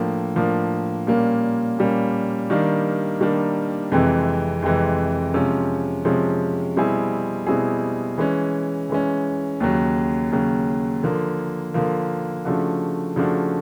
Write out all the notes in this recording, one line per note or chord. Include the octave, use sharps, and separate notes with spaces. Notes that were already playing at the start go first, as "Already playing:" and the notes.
Already playing: A2 F3 A#3 D4
A2 F3 A#3 D4
A#2 G3 A#3 C#4
A#2 G3 A#3 C#4
D#3 G3 A#3 D4
D#3 G3 A#3 D4
F2 C3 E3 G#3
F2 C3 E3 G#3
C3 F3 G#3 C#4
C3 F3 G#3 C#4
B2 G3 C4 E4 G#4
B2 G3 C4 E4 G#4
E3 G#3 C#4
E3 G#3 C#4
D#2 C#3 F#3
D#2 C#3 F#3
D3 F3 A#3
D3 F3 A#3
C#3 F3 A3 D4 F#4
C#3 F3 A3 D4 F#4